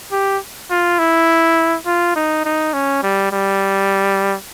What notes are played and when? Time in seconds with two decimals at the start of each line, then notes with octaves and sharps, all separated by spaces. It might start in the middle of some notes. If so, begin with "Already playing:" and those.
0.12 G4
0.70 F4
0.99 E4
1.86 F4
2.16 D#4
2.45 D#4
2.74 C#4
3.03 G3
3.32 G3